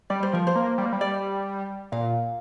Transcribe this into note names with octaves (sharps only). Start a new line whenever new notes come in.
G3 D5
C5
F3 A#4
C5
A#3
G3
A#3
G3
D5
A#2 F5